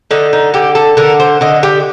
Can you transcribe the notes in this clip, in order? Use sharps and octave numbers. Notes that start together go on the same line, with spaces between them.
D3 D#4
D#4
D3 G4
A4
D3 A#4
C5
D3 D#5
G4